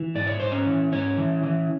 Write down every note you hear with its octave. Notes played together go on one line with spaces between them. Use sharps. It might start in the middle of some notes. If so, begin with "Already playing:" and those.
Already playing: E3
G#2 D5
C#5
G#2 C5
C#4 C#5
E3
G#2 C#4 C#5
E3
E3